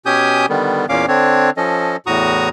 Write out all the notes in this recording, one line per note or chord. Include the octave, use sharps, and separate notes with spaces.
B2 C#4 G4 G#5 D#6 G6
D3 D#3 G3 B3
E2 A#2 A#3 C#4 F5 D6
D3 C4 D4 C#5
F3 C#4 A4 D#5
E2 A2 F#4 A#5 C#6 D#6